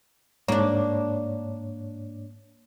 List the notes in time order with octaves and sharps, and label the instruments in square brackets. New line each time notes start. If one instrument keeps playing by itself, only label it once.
[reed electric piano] G#2 C#5 [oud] A#3 D4